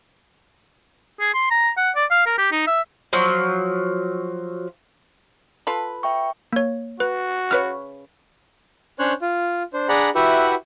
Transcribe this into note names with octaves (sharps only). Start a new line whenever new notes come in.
G#4
C6
A#5
F#5
D5
F5
A#4
G4
D#4
E5
F3 F#3
F4 A4 B4
E5 G5 C#6
A#3 C#5
F#4 B4
C#3 B4 C#5 F6 F#6
C#4 D4 C5 C#5 F#6
F4
D4 C5
D4 G#4 D5 F#5 A#5 B5
E4 F#4 G4 B4 E5 F#5